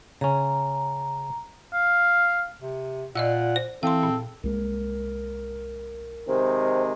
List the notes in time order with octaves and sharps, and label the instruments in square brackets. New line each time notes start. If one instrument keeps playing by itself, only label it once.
[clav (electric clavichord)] C#3 C#4 [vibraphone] A#5
[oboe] F5
[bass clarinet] C3
[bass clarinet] A#2 [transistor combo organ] F4 F#5 [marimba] D5 D#5 E6
[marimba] C5
[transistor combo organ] E3 [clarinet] C4 [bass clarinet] A4 [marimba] F5 C6
[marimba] A#2
[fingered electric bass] C2 G#3 A#3 [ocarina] A#4
[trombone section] C3 D#3 G#3 [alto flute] C5